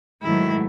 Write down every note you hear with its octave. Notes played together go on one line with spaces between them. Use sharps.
G#2 D#3 F#3 A3 E4